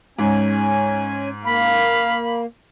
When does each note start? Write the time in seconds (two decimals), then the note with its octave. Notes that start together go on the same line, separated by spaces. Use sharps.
0.19 G#2 C#4 G#5
1.45 A#3 F5 B5